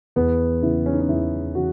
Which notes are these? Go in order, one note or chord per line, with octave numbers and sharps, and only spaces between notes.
E2 B3
C#3 E3 E4
C#4
D#4
C#4
E2 E4
C#3 E3 F#4